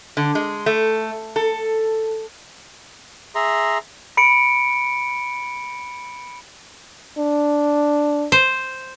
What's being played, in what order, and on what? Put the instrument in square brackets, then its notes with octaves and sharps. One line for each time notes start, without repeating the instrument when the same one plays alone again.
[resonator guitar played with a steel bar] D3
G#3
A3
A4
[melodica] G#4 E5 A#5 C6
[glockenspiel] B5 C#7 D7
[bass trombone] D4
[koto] C5